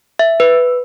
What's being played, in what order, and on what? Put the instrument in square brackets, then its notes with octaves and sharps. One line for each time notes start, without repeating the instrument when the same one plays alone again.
[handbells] E5
B4